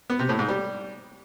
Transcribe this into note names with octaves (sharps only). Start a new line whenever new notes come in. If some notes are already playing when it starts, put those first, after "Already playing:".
B3
C3
A2
G#2
G3